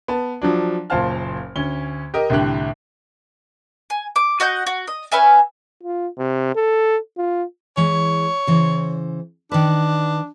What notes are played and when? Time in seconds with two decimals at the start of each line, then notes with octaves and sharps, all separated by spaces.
0.08 B3 A5
0.42 F3 F#3 D4
0.90 F#1 A#2 C5 F5 A5 F6
1.56 D2 C#4 G7
2.14 G4 A#4 D#5
2.30 C2 A2 D3 G4 F#6
3.90 G#5
4.16 D6
4.40 F#4 D#5 F#5 G6
4.66 F#4
4.88 D#5
5.12 C#4 B4 E5 G#5
5.83 F4
6.18 C3
6.55 A4
7.17 F4
7.77 E3 G#3 C#5
8.47 C#3 E3 C5
9.52 D#3 D4 B4